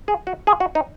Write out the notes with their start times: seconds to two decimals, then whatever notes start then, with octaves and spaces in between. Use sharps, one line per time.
0.08 G#4
0.27 F#4
0.47 G#4
0.60 F#4
0.75 D#4